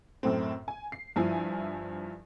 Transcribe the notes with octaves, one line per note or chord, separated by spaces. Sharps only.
F#2 A2 C4
G#5
C7
G2 F3 E4 E5 G#5